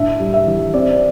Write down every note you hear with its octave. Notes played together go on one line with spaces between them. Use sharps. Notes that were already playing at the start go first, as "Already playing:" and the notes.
Already playing: A2 D4 E5
G3
E5
E3
C4 D5